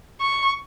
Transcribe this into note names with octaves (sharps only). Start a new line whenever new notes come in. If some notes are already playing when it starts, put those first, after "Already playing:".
C#6